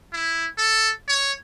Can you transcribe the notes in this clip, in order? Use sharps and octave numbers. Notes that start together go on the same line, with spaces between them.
E4
A4
C#5